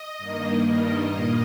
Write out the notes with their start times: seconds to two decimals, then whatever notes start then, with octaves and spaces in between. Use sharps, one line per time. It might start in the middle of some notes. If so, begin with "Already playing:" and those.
Already playing: D#5
0.18 G2 D#3 A#3
0.63 G2 D#3 G3 A#3 D#5
1.10 A#2 A#3